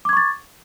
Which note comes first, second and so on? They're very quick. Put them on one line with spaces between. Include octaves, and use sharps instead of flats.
D6 G#6 C#6 A6